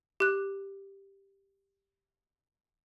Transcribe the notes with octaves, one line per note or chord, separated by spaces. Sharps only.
G4 F#6